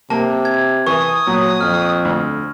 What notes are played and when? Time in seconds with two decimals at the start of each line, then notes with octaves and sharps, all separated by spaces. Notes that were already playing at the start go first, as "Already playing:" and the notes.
0.10 C3 A#3 A5
0.45 G#6
0.87 E3 C#6 D#6
1.27 A#2 F#3
1.61 F2 F6
2.05 D2